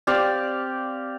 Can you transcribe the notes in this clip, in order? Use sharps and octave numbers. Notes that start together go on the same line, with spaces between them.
C4 G4 D5 F5